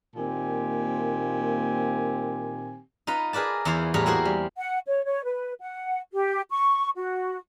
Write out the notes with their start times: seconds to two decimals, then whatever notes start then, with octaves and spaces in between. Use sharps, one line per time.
0.15 A#2 D#3 A#3 C4 G4 G#5
3.07 D#4 F4 B4 A#5
3.33 G#4 A#4 B4 D5 A5
3.65 E2 E3 E4 C5 F5 A#5
3.94 A2 G3 G#4 A#4 C#5 A#5
4.06 A#3 E4 F#4 G#4 C5
4.25 G3
4.57 F#5
4.86 C#5
5.04 C#5
5.24 B4
5.60 F#5
6.12 G4
6.50 C#6
6.95 F#4